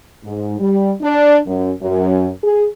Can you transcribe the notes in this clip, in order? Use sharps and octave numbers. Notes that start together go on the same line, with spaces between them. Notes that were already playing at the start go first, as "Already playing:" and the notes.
G#2
G3
D4
F#2
F#2
G#4